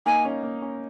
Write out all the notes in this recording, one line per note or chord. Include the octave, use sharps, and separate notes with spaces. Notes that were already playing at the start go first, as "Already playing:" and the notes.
A#3 D#4 G#5
C#4
A#3
C#4